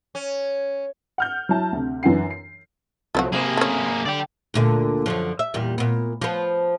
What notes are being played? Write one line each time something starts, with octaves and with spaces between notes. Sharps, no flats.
C#4
F#5 F6 G6
F#3 E4 A5
D2 C3
F#2 E3 D4 F#5 C7
C7
C2 F3 F#3 A3 E4 F#4
C3 A#3 G#4 B5
A3 C#4
D3 D5 G5
D2 A#2 D3
F#2 D3 F3
E5
E2 A#2 G3
A#2 B3
F3 B3